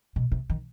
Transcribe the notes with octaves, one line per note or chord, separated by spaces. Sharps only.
B2
C3
D#3